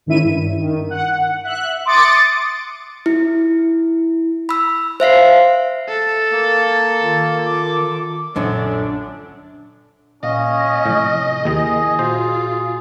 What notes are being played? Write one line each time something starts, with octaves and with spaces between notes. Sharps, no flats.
G#2 D#3 C#4 E4 E5 D#7
G2
D#3
F#5
E5 F#6
C6 D6 D#6 A6 C#7 D7
E4
B5 E6
C5 E5 F5 C7
A4
A#3
D#3 F4
D6
A#1 F#2 D3 C#4 D4
A#2 C#4 D#5 F5
A2 C3 F3
D#2 D#3 E4 G#4
A#2 F4 F#4 C5 C6